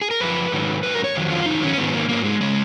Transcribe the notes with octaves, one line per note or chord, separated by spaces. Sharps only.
G#4
A#4
F#2 F3 B4
G#2 D#3 F#3
G#2 F#3 B4
A#4
C#5
F2 D#3 F#3
F4
F2 D#3 F#3 D#4
C#4
G#2 D#3 F#3 B3
A#3
G#2 F#3 A#3
G#3
C#3 G#3